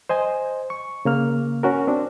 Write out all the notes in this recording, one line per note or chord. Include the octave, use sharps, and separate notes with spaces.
C5 D#5 G#5
C#6
C#3 A#3 F6
C#4 F#4 A#4
C4 D4